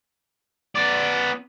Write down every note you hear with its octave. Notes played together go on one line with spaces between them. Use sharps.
B3 D5